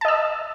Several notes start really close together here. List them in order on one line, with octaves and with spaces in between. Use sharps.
A5 D#5 E6